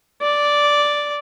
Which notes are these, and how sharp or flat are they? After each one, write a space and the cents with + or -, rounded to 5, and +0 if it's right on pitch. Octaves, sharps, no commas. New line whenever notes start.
D5 -5